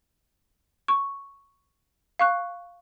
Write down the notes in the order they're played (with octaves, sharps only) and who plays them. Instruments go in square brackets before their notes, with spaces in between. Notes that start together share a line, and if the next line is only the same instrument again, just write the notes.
[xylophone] C#6
F5 C#6 F#6